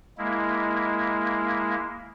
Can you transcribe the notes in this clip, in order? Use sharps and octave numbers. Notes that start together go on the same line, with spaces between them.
G#3 A#3 E4